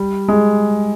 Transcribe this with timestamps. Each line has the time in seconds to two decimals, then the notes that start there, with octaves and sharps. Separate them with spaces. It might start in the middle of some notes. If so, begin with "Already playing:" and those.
Already playing: G3
0.28 G#3